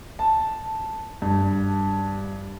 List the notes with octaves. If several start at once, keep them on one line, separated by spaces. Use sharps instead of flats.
A5
G2